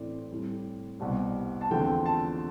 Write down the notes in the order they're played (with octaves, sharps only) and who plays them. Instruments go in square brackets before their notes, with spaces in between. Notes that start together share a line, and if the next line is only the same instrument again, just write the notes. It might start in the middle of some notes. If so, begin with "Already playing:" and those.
Already playing: [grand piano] A2 E3 A3 C4 D5
A2 G3 C4
C2 B2 G3
A5
E2 D3 F3 A3 C4 G5
A5